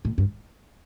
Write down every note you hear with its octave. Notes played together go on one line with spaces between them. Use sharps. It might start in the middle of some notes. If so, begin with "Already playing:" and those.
A2
G2